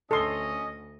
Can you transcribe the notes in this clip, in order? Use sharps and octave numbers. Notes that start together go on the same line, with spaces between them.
D2 C#4 A4 D#5 C6